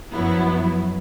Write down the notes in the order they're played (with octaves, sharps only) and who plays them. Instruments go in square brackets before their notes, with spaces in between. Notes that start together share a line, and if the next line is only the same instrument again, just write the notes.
[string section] F#2 F3 F#3 B3 E4